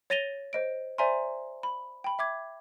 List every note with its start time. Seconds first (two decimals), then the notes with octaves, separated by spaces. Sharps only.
0.10 C#5 A6 A#6 D#7 F7 G7
0.53 C5 D#5 D7
0.98 C5 D5 E5 G#5 A#5 C6
1.63 B5
2.04 G5 B5
2.19 E5 D6 G#6